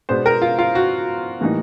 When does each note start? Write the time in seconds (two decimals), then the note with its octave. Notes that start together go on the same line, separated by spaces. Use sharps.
0.09 B2 G#3 B3 D4 C5
0.26 A#4
0.42 F4
0.59 F4
0.75 F#4
1.41 A2 E3 G3 A#3 D#4